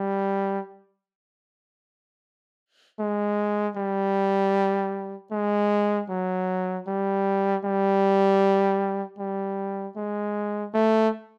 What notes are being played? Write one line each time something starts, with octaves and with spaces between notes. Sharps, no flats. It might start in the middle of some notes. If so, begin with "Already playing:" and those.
Already playing: G3
G#3
G3
G#3
F#3
G3
G3
G3
G#3
A3